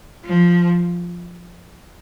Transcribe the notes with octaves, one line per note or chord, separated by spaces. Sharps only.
F3